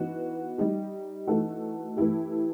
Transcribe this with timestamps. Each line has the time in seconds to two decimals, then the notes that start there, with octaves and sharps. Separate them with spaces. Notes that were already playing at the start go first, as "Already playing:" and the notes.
Already playing: E3 B3 D#4 F#4
0.58 G3 D#4 G4
1.27 E3 A3 D#4 F#4 A4
1.97 E3 A3 E4 G4